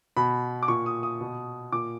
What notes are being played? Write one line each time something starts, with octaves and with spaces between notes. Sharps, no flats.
B2 B5
D6
A#2 C#6
D#6
D#6
B2
A#2 D6